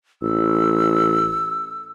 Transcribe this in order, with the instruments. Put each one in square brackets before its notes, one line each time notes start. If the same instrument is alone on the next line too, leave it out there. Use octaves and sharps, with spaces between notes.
[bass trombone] A1 [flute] E6